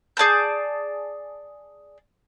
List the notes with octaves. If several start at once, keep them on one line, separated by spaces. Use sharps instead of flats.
G#4 D5 A5 G6